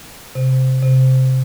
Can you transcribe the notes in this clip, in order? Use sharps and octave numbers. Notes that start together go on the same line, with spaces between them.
C3
C3